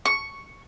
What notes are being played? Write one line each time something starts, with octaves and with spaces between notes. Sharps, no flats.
C#6